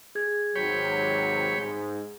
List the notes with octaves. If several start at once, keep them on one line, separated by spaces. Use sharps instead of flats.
G#4 G#6
G#1 C3 F#3 C#5 G5 B5
G#2